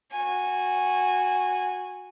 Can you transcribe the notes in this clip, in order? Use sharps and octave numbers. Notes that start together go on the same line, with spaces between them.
F#4 G#5